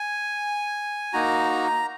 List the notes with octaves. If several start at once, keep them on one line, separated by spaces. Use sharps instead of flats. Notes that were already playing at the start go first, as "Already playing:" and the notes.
Already playing: G#5
A#3 D#4 F#4 A#5